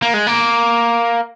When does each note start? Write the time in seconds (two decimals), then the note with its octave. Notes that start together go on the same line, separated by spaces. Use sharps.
0.02 A#3
0.14 G#3
0.27 A#3